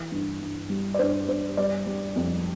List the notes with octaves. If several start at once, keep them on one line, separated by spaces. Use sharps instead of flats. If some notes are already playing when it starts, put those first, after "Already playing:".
Already playing: E3
G2
G2
G3
D5
G2 C5
G2 C5
G3 D5
G3
F2